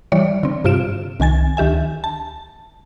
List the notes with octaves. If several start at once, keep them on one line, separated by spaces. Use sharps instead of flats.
E3 G3 C#5 D5
D3 C4
G2 C3 F4 D7 E7
C2 D#3 G#5 A6
D2 D#3 G4 E5 G#5
A5